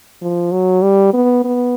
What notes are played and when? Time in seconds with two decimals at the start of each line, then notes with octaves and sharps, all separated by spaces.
0.22 F3
0.52 F#3
0.82 G3
1.14 B3
1.45 B3